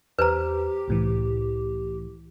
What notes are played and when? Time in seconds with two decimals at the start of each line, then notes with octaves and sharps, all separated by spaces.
0.19 E2 G4 B4 C5 A#5
0.88 C2 A2 E3